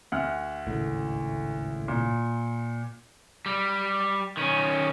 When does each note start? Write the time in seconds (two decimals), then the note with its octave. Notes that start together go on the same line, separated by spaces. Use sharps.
0.12 D2 F#5 F6
0.67 G#1 C#2 A2
1.88 A#2
3.46 G3
4.37 D#3 C#4